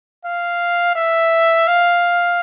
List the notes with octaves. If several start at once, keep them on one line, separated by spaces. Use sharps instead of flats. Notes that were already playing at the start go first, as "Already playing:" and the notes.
F5
E5
F5